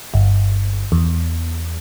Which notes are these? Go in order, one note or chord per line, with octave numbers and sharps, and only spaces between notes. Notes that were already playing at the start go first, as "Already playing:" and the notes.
G1
E2